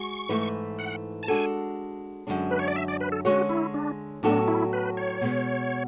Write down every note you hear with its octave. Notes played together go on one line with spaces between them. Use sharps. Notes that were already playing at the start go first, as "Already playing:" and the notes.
Already playing: G#3 F#4 C#6
G#2 E3 A3 E4 B4
F#5
A5
G#3 D4 F#4 A4 G#5
F#2 D3 G#3 D4
B4
C#5
D5
E5
D5
B4
A4
D3 G#3 C#4 F#4 G#4 C#5
E4
D4
A2 F#3 B3 D4 F#4 A4
E4
B4
C#5
B2 G#3 B3